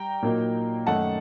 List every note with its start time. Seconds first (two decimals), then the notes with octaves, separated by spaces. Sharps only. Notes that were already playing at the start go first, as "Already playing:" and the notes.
Already playing: G3 G5 A#5
0.23 A#2 F#3 A#3 D#4
0.87 F#2 D#3 A3 D#4 F#5 A5